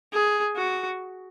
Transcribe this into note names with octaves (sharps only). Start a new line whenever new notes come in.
G#4
F#4